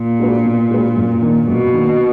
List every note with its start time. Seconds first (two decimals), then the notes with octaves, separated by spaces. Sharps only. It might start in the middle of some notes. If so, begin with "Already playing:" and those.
Already playing: A#2
0.19 G#3 D4 F#4 B4
0.45 B2
0.71 G#3 D4 F#4 B4
0.97 F#2
1.22 D#3 A#3 D4
1.47 F#2 B2
1.73 D#3 A#3 D4